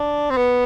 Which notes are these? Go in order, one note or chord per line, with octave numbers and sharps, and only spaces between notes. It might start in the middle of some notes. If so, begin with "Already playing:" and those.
Already playing: D4
C4
B3